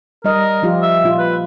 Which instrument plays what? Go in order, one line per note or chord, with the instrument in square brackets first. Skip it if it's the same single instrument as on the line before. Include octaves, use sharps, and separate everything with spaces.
[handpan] G3 D#5 [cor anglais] A#4
[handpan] F3 F4 G4
[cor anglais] E5
[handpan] A#2 F4
[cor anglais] B4